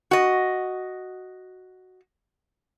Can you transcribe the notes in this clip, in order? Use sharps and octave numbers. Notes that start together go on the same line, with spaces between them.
F#4 D#5